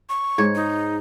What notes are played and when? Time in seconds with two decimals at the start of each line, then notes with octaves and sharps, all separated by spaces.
0.09 C#6
0.38 G#2 C#5
0.55 D#4